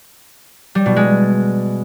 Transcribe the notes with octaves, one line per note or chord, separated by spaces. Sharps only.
G3
B2
G#3